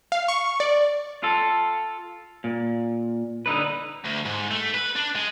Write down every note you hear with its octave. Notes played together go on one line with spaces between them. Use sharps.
F5
C#6
D5
F4 A4
A#2
D3 D#4 B4
D2
G#2
A3
B4
D4
G#3